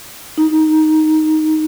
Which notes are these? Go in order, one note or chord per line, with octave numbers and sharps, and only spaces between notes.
D#4